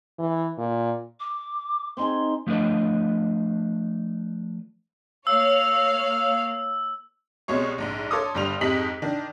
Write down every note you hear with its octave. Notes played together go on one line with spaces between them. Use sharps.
E3
A#2
D6
C4 D#4 G#4 C6
F3 A3 D4 B4 D#5
A#3 C#5 F5 E6
C2 B2 G#3 C#5 C#6
A#1 G#2
A4 C#5 C6 D6 D#6
G1 G2 G3 C6 F7
F2 G#2 G4 D#5 B6 F#7
D#3 D4